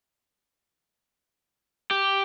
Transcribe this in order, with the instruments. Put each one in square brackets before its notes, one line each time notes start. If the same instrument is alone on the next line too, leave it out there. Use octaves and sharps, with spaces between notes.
[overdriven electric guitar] G4